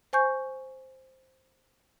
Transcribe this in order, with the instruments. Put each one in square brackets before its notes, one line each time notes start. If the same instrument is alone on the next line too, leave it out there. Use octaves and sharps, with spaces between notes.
[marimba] C5 G#5 C#6 G6